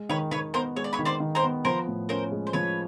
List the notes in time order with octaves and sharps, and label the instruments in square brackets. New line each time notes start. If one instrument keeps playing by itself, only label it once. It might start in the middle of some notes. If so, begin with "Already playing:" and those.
Already playing: [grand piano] G#3
[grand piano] D#3 [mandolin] B4 C#5
[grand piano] D#3 [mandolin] B4 C#5
[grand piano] B3 [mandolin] A#4 C5
[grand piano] G#3 [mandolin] C#5
[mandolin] D5
B4 C#5
[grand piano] D#3
[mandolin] C5 D5
[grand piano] D#3
[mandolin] A#4 C5
[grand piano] B3
[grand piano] F3 [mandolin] A#4 C5
[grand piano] A2
[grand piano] C#4 [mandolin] A#4 C5
[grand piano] G#3
[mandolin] C5
[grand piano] F3 [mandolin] B4 C#5